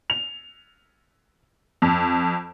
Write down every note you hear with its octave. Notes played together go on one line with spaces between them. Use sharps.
F7
F2